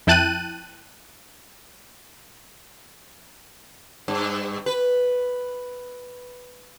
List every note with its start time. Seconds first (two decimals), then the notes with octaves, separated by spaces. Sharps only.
0.07 F2 E4 G5 A5 F#6 D#7
4.08 G2
4.66 B4